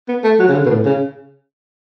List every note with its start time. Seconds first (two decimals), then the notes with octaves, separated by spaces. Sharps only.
0.08 B3
0.24 A3
0.39 F#3
0.49 C#3
0.54 D3
0.66 B2
0.70 A2
0.85 C#3